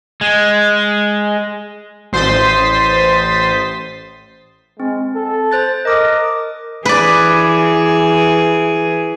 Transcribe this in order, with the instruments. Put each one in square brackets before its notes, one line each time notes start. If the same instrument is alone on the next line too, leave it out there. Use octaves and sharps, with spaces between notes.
[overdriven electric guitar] G#3
[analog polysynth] A1 C5 C6 D#6 A6 B6
[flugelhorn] G#3 [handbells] C4
[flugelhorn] A4
[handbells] C5 F#6 A6
[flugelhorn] A#4 [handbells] D#5 D6 D#6
[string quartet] E3 G#4 [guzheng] B4 D5